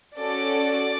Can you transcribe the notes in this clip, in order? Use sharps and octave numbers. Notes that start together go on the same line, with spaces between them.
C#4 F#4 A4 D5 D6